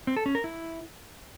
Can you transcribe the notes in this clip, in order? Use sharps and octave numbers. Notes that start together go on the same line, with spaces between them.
C4
A4
C#4
A#4
E4